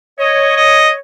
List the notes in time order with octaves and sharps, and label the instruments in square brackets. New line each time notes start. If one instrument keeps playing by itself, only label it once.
[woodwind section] C#5 [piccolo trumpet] D#5
[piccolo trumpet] D#5